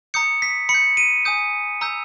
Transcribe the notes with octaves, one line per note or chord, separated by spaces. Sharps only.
A#5 D#6 G6 C#7
B6
B5 C#7
G6
D#7
G#5 D#6 G6
A#5 E6 G6